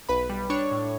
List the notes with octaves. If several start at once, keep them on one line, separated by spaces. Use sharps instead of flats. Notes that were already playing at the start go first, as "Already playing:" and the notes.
B1 B4 B5
G3
D4 C#5 C#6
A2